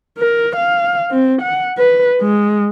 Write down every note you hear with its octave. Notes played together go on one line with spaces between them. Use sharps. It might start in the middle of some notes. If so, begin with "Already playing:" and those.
A#4
F5
C4
F#5
B4
G#3